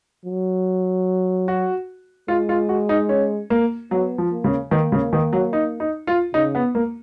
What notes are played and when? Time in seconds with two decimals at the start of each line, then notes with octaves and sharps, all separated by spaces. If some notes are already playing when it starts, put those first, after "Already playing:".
0.26 F#3
1.48 F#4
2.28 G#3 F4
2.49 F4
2.69 F#4
2.89 D#4
3.09 C#4
3.50 A#3
3.91 F#3 B3
4.18 F3
4.31 A#3
4.44 C#3
4.71 D#3 A#3
4.92 C#3
5.13 D#3
5.33 F#3
5.53 D#4
5.80 D#4
6.07 F4
6.34 C#3 D#4
6.55 B3
6.75 A#3